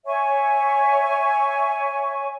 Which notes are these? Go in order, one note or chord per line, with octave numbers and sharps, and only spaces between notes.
C#5 E5 G#5 C#6